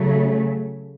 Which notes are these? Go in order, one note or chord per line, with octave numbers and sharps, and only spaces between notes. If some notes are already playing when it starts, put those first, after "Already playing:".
Already playing: C#3 F#3 A3